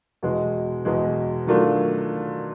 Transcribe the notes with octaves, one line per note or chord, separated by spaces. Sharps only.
E2 B2 G#3
E2 B2 G#3
D#3 F#3 A3 D4 F4